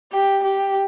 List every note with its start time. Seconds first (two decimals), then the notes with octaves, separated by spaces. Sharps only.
0.13 G4
0.43 G4